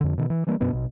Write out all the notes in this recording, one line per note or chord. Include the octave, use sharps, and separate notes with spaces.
F2 D3
B2 D#3
E3
E3 G3 A#3 D4
F#2 B2 B3 D4
A#1 B2